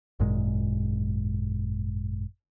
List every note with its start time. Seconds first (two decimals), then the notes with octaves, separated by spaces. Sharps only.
0.20 G#1 F#2 A#2 G#3